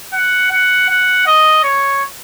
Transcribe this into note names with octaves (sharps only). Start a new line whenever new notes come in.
F#5
F#5
F#5
D#5
C#5